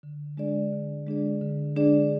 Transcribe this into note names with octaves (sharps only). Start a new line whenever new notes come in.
D3
G#3 D4 G#4 D5
D3
G#3 D4 G#4 D5
D3
G#3 D4 G#4 D5